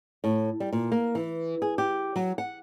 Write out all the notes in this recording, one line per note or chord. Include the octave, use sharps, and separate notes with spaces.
A2
G3
A#2
A#3
E3
G#4
G4
F#3
F#5